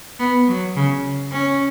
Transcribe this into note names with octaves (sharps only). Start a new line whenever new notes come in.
B3
F#3
C#3
C#4